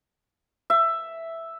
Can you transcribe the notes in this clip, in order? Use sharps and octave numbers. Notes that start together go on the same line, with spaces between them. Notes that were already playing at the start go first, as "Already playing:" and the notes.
E5